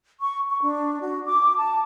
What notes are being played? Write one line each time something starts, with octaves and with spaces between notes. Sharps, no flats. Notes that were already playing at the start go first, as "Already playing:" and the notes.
C#6
C#6
D4
F#4
D6
A5